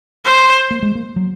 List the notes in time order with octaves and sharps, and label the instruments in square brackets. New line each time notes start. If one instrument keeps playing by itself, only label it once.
[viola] C5
[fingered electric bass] A#3
G#3
A#3
F#3